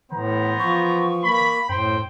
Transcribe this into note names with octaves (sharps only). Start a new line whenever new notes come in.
A2 E3 B3 C5 A#5
F3 C#6
A#3 B5
F#2 A2 C5 G5